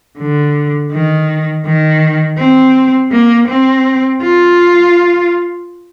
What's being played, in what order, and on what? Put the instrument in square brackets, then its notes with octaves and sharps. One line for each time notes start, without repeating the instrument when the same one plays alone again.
[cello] D3
D#3
D#3
C4
A#3
C4
F4